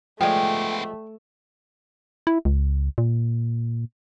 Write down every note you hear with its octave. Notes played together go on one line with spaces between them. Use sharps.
F3 G#3 A3 B3 G4 D5 G5
E4
C#2
A#2